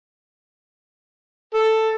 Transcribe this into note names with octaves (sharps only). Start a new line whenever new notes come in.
A4